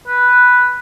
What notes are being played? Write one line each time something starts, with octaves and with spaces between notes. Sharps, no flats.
B4